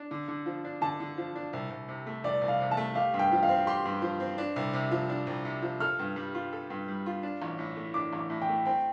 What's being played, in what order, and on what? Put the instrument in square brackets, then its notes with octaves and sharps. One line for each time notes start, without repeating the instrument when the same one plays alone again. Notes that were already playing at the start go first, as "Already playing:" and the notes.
Already playing: [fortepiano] D4
D3
D3
F3
D4
[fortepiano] D3 [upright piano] A5
[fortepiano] D3
F3
D4
C2
C2
C3
A3
[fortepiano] C2 [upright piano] D5
[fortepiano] C2
[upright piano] F5
[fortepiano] C3
[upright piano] A5
[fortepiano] A3
[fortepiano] G4 [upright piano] F5
[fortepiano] G2
[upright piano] G5
[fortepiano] F3
[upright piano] F5
[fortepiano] C4
[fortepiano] G4 [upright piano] C6
[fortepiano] G2
F3
C4
D4
C2
C3
F3
D4
C2
C3
F3
[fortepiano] A4 [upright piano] F6
[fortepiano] G2
G3
F4
A4
G2
G3
F4
D4
A1
A2
A3
[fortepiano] D4 [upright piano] D6
[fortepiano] A1
[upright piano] D6
[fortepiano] A2
[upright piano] G5
[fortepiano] A3
[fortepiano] C4 [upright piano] G5